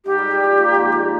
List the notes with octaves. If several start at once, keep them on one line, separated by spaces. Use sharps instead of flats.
G#2 G4
G3
G3
F3
A#2
G#2
A#2